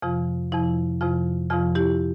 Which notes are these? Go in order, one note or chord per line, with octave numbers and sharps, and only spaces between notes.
F2 C3 F3 F4
F2 C3 F3 E4
F2 C3 F3 F4
F2 C3 F3 F4
E4 G4